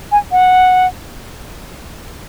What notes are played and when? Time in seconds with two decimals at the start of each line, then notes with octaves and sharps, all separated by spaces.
0.12 G#5
0.31 F#5